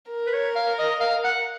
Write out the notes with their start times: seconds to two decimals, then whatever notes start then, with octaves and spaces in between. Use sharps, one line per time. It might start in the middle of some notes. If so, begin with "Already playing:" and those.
0.10 A#4
0.27 B4
0.34 C#5
0.56 F5
0.79 D#5
1.00 F5
1.24 F#5